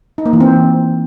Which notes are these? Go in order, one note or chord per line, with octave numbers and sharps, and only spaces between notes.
D#4
A#3
E3
C4